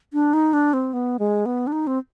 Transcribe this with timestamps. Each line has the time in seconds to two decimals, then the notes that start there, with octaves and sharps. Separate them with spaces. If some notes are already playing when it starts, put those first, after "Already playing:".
0.13 D4
0.33 D#4
0.53 D4
0.73 C4
0.93 B3
1.19 G#3
1.46 B3
1.67 D4
1.72 D#4
1.87 C4